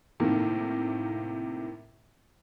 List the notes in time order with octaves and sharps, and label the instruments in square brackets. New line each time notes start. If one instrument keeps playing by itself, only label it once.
[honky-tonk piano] A2 C3 D#3 A#3